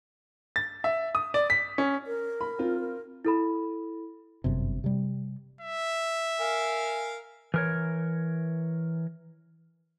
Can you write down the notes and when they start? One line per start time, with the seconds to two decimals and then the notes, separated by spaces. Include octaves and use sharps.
0.56 A6
0.84 E5
1.15 D#6
1.34 D5
1.50 B6
1.78 C#4
2.06 A#4
2.41 B5
2.59 C4 F4
2.80 A#4
3.25 E4 A4 B5
4.44 G1 F#2 C3
4.84 C3 G3
5.61 E5
6.40 A#4 F5 G#5
7.54 E3 A#4 C#5